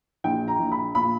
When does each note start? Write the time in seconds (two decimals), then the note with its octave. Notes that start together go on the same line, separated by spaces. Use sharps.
0.24 A#1 G5
0.48 A#5
0.59 A#1
0.72 B5
0.95 A#2 B5